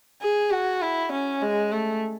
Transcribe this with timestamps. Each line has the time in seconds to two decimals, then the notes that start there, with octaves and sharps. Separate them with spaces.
0.21 G#4
0.51 F#4
0.81 E4
1.12 C#4
1.42 G#3
1.72 A3